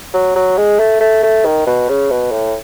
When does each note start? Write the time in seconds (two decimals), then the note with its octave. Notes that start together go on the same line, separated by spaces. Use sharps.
0.14 F#3
0.36 F#3
0.57 G#3
0.79 A3
1.00 A3
1.23 A3
1.45 D#3
1.67 B2
1.89 C#3
2.11 B2
2.32 A2